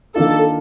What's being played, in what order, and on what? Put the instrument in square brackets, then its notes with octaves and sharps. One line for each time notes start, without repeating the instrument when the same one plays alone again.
[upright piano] D#3 A#3 D4 F4 [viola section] A4